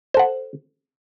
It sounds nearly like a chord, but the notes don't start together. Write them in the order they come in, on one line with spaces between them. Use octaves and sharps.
C5 A4 F#5